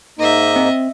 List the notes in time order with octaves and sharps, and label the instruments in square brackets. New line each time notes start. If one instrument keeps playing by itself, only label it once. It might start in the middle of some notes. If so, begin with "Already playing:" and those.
[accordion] G#2 A#3 D#4 [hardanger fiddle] D#5 E5
[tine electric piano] C4